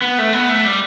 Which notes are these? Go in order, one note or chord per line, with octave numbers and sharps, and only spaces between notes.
B3
A3
B3
A3
G3